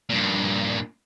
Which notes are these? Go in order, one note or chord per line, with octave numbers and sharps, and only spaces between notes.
G2 A#2